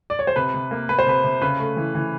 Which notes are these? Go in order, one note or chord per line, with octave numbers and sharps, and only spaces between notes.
D5
C#5
C5
C3 B4
C3
A#3
A#3 B4
C5
C3 B4
C3
C#3 B4
A3
E3
E3